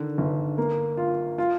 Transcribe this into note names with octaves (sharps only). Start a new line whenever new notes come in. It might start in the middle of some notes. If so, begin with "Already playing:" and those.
Already playing: D3 D#3
G1
A#3
F4
F4